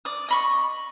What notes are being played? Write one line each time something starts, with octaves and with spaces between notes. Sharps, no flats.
D5 D#6
D#5 B5 C#6